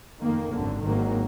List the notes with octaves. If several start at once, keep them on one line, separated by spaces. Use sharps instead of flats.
F2 D#3 A#3
G#1 F#2 D3
G#1 G#2 D#3 F#3 A#3